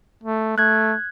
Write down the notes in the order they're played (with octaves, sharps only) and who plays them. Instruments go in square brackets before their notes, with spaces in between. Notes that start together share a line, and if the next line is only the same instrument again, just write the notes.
[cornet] A3
[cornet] A3 [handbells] F#6 G#6